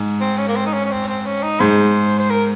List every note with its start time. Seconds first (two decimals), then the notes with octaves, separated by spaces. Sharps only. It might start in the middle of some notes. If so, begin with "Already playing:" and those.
Already playing: G#2
0.21 C4
0.38 C#4
0.48 A#3
0.56 C4
0.66 D#4
0.73 C#4
0.85 C#4
0.91 C4
1.08 C4
1.26 C#4
1.43 D#4
1.60 G#2 C5
2.19 C5
2.30 A#4